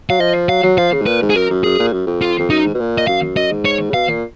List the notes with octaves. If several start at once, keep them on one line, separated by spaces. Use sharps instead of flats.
F#3 F5
F3 D#5
F#3 F5
F#3
F3 F5
C#3
G#2
A#2 B4
G#2
G#4
F#2 A#4
F#2
F#2 G#4
A#2
F#2
F2
F4
F2
F#2 D#4
G#2
B2
A#2
D#5
F#2 F5
F#2 D#5
G#2
C#5
C#3
B2 F5
A#2